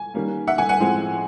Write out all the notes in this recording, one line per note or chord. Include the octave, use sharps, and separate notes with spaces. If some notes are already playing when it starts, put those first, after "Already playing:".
Already playing: G#5
D#3 G3 A#3 C#4
E5 F#5
F#5 G#5
F#5 G#5
A2 F3 G#3 C4